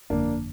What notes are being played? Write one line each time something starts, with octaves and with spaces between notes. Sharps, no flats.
G1 F2 D3 A#3 D4